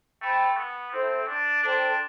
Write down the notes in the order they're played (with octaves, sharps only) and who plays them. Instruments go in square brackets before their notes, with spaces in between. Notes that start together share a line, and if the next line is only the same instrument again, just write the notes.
[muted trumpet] A3 [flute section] C5 G5 B5
[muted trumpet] B3
[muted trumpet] C4 [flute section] E4 A4 C5
[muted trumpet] D4
[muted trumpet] D4 [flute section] A4 C5 G5 C6